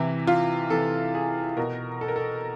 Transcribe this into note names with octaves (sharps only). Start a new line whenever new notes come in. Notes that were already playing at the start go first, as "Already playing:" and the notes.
Already playing: C3 E3 E4
F4
C3 E3 A4
G#4
B2 A#4
A4
A#4
A4